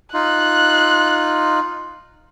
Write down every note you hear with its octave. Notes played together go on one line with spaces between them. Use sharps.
D#4 F4 F#6